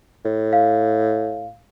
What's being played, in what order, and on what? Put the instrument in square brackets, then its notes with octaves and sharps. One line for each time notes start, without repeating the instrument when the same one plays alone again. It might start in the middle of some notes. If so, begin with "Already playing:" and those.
[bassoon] A2
[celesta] F5